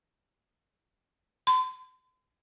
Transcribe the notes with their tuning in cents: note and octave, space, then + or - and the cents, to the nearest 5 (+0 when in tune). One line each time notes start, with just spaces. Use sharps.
C6 -40